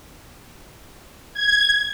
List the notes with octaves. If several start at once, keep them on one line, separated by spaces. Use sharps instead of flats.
G#6